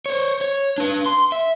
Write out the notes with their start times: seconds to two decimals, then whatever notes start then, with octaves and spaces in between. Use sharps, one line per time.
0.06 C5 C#5
0.41 C#5
0.78 D4 B4
1.06 C6
1.32 E5